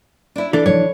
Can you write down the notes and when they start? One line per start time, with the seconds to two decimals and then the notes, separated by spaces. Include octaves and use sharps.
0.36 D4 E4
0.53 E3 D4 A4
0.66 F3 D#4 C#5